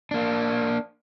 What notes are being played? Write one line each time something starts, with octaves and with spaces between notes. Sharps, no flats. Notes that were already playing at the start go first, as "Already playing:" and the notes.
A#3 D4